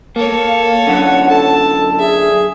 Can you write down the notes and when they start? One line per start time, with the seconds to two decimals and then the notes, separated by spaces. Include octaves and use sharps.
0.16 A#3 A4 C#5
0.48 F5
0.87 F#2 D3 F#5
1.29 A4 A5
1.99 G#4 E5